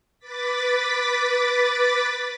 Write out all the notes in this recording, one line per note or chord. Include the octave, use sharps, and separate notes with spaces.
B4 D6 A6 B6